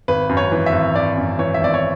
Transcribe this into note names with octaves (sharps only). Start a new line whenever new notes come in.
G#1 B4
F#2
C#5
E3
E5
G#1
G#1 D5
F#2
E3 C#5
E5
G#1 D5
C#5